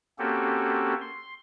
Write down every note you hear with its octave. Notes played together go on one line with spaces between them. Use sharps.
A#3 C4 C#4 F#4 G4 A4
C6